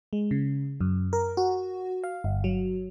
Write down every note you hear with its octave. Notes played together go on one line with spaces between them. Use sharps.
G#3
C#3
F#2
A#4
F#4
F5
G1
F#3